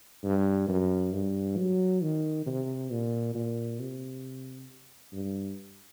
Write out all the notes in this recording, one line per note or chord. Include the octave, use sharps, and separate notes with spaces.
G2
F#2
G2
F#3
D#3
C3
A#2
A#2
C3
G2